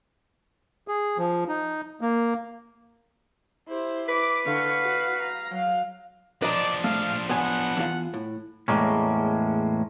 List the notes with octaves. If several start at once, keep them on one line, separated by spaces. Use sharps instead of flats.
G#4
F3
D#4
A#3
E4 G4 C5
B4 D6
D3 F5 C#6
F#4
A#5
F#3 F5
F3 D4 B4 D5 D#5 A#5
A3 F5
B3 C#5 F#5 G#5
E2 F4
A2
E2 A2 C3 G#3 A#3 C#4